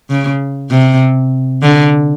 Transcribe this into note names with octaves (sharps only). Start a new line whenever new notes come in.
C#3
C3
D3